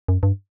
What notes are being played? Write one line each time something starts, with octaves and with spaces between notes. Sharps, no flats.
F#2
G2